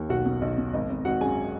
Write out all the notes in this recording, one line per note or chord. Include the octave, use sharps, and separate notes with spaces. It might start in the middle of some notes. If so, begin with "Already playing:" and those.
Already playing: D#2
B1 F#4 F#5
B2
B1 D#5
B2
G#1 D#5
G#1
G#1 F#4 F#5
F#2 G#4 G#5